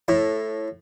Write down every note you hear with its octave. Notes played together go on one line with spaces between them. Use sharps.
A2